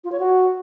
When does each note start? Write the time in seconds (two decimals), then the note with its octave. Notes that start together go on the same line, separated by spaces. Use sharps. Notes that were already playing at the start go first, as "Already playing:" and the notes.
0.04 F4
0.12 C#5
0.19 F#4